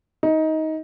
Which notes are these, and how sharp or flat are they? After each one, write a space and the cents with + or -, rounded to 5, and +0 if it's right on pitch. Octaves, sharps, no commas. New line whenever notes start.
D#4 +20